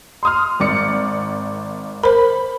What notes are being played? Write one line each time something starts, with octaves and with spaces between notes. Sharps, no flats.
C6 D#6 F6
G#1 D5 C#7
A#4 C5 B5